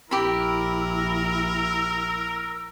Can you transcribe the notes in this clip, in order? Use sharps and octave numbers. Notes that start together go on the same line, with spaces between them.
A#1 E4 G4 A#4 B5 E6